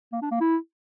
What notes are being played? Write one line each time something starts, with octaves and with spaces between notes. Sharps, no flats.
A#3
D4
A#3
E4